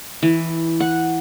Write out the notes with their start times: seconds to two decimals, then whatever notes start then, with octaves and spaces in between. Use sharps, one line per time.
0.23 E3
0.80 F#5